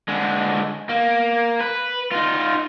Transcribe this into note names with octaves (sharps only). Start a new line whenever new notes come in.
D3 G#3
A#3
B4
D#4 F4